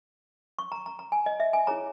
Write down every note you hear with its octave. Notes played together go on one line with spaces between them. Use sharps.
C#6
A#5
A#5
A#5
G#5
D#5
E5
G#5
E4 G#4 C#5 A#5